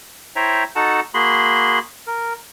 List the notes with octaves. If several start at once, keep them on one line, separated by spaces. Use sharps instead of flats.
E4 C5 C#5 E5 G5 A#5
D#4 F#4 A4 F#5 A5
A#3 F#4 G#4 B5 C6
A#4